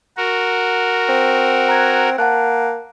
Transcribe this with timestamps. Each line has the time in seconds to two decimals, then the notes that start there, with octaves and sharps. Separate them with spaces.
0.17 F#4 A#4
1.09 C4
1.69 A#5 F#6 G#6
2.18 A#3 F#5 A5 F#6